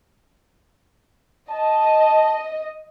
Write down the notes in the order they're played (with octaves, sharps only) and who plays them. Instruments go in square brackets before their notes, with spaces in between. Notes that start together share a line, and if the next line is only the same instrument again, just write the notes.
[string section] D#5 [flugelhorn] A5